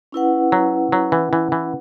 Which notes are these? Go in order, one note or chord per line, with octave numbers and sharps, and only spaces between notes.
C#4 E4 B4 F#5
F#3
F#3
E3
E3
E3